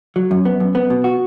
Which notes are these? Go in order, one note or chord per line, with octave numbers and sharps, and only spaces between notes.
F#3
F#2
B3
F#2
B3
B2
F#4